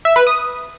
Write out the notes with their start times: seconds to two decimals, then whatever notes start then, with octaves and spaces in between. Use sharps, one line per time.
0.05 E5
0.16 B4
0.27 D#6